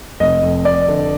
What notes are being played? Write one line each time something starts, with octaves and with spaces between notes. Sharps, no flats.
F1 D#5
F2
F2 D5
D3